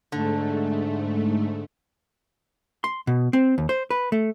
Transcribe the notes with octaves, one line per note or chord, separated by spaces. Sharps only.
G#2 D3 A3
C6
B2
C4
D#2
C5
B4
A3